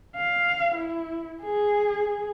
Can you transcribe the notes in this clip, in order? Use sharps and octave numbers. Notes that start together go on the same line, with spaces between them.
F5
E4
G#4